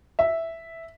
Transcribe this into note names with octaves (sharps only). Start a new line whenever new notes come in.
E5